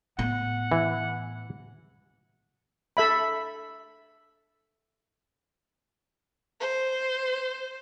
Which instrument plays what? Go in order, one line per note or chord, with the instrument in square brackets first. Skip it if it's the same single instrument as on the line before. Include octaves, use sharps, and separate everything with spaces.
[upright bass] A2 B3 [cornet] F#5
[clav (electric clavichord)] E3
[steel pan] A4 E5 B5
[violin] C5